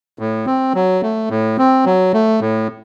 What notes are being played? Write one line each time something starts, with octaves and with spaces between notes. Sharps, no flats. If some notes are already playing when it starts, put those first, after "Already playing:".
A2
C4
F#3
A3
A2
C4
F#3
A3
A2